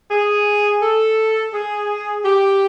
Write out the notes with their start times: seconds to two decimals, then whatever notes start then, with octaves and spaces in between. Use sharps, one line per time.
0.11 G#4
0.82 A4
1.54 G#4
2.25 G4